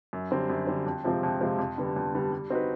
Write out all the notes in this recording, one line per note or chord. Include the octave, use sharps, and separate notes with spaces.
F#2
D3 G3 C4
F#2
D3 G3 C4
F2
C3 F3 G#3 C4
F2
C3 F3 G#3 C4
F2
D3 G3 B3
F2
D3 G3 B3
G3
C4 D#4 F#4 B4